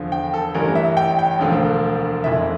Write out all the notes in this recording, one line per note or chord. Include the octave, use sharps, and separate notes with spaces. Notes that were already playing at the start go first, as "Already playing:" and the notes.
Already playing: E2 D3 F3
G5
A4
A1 G2 E3 A#4
E5
G5
G5
E1 D2 D3 F3
F1 F2 E3 E5